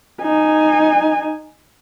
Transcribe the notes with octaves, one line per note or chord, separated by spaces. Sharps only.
D#4 G#5